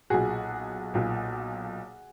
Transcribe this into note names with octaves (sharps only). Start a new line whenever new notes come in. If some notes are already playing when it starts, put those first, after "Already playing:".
B1 A#2 F#4 G#4
B1 A#2